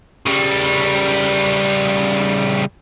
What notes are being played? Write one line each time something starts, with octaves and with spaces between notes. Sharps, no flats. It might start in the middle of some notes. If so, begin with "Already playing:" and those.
C#3 G3